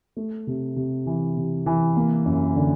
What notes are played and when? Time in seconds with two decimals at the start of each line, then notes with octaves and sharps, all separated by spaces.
0.17 A3
0.47 C3
0.76 C3
1.06 E3
1.37 C3
1.66 E3
1.96 A#3
2.26 F#2
2.56 D3